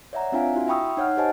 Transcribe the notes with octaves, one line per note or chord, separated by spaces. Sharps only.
C#5 D5 E5 F#5 A#5
C4 D4 F4 E5 F5 G#5
E4 F#4
E5 G5 B5 C#6 D#6 E6
D#4 C#5 F#5 F6
G4 C5 D#5 G#5 A5